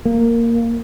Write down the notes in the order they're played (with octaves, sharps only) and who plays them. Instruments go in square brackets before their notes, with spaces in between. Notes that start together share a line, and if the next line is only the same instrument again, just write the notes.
[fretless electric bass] A#3